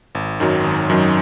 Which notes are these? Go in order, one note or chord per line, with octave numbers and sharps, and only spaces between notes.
G#1
F#2 D#3 F#3
G#1
F#2 D#3 F#3